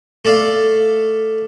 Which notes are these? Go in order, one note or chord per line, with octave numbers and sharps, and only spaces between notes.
A3 A4 D5 F5